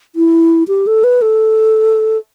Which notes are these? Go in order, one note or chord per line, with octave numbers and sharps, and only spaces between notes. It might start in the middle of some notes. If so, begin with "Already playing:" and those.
E4
G4
A4
B4
A4